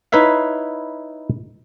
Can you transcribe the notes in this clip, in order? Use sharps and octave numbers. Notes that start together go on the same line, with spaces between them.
D#4 E4 B4 C#5 E5 F5